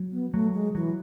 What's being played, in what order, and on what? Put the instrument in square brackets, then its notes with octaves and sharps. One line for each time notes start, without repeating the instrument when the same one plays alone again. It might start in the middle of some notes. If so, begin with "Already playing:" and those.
Already playing: [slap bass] F#3
[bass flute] B3
[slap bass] F#3 [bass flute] A3
[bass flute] G#3
[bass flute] E3 [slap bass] F#3